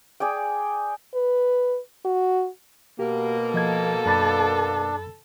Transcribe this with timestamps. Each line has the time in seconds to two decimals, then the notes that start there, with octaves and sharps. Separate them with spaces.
0.20 G#4 D5 G5
1.14 B4
2.05 F#4
2.99 B2 A#3 G4
3.54 F3 A4 D#5 G#6
4.05 F#2 D4 B5 A6